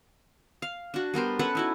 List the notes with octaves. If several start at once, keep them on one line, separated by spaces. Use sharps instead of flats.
F5
D4 F#4
G3 B3 A#4 C5
C#4 A4 B4 F#5
D#4 E4 F#4